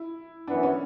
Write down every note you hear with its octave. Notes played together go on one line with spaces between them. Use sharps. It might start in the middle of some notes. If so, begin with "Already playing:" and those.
Already playing: E4
F#2 E3 B3 D4
C#4